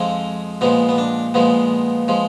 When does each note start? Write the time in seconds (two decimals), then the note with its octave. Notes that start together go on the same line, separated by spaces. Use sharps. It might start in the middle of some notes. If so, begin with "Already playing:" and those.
Already playing: F2 F3 G#3 D#4
0.61 A#2 F3 G#3 B3
0.89 B3
0.98 D4
1.34 A#2 F3 G#3 B3
2.08 F3 G#3